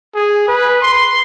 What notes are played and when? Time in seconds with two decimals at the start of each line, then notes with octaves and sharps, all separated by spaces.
0.15 G#4
0.48 B4
0.82 C6